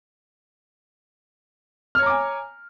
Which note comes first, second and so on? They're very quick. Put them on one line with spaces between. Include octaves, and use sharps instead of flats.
F6 C#5 A#5 D6 G#5